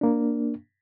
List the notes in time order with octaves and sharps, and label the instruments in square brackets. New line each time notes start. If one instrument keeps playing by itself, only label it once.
[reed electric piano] A#3 D4